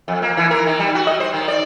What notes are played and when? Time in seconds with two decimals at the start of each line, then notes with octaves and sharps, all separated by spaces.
0.08 F2
0.22 A#3
0.37 E3
0.51 A#4
0.66 D#3
0.79 G3
0.95 F#4
1.07 D#5
1.20 C5
1.34 D#3
1.48 D5